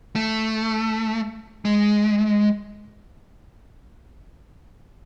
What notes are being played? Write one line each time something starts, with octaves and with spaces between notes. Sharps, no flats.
A3
G#3